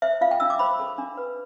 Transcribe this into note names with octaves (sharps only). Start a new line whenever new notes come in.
C5 E5
F4 F5
G5
D4 E6
D6
C5 B5
A4
D4
B4